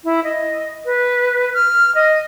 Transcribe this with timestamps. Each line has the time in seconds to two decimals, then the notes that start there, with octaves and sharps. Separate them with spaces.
0.04 E4
0.24 D#5
0.86 B4
1.54 F6
1.95 D#5